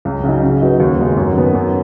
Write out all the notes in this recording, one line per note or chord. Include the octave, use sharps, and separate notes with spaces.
C#2
C#3 F#3 D#4
C#3
F#3 D#4 F#4 B4
D#2
C#3 G#3 B3 F#4
F#2
D#3 B3
F#2